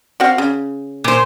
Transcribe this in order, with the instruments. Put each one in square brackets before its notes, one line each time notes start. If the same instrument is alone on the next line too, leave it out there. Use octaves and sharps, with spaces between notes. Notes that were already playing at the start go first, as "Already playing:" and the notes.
[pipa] C4 F#4 F5
C#3
[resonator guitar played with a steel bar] A#2 C5